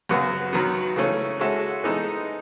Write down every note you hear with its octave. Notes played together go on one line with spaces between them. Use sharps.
F#2 C#3 F#3 B3 F#4
D#3 F#3 B3
C#3 E3 A3 C#4
G#3 C#4 F#4 A4 E5
E3 G#3 B3 D#4 A4